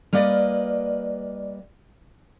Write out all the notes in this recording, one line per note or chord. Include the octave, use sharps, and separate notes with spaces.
G3 A#3 B4 D5 D#5